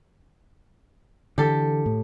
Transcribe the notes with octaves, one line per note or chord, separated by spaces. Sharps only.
D3 E3 G4 A4
A2